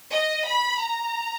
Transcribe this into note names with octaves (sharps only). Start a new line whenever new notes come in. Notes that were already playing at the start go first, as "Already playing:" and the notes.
D#5
B5
A#5